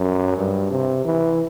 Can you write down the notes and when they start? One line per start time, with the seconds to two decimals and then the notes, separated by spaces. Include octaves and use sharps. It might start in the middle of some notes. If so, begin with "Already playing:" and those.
Already playing: F#2
0.37 G2
0.71 C3
1.05 E3